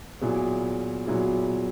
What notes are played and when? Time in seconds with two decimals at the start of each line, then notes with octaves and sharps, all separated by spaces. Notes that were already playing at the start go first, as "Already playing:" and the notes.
0.21 A#2 F#3 B3 E4 G#4
1.07 A#2 F#3 B3 E4 G#4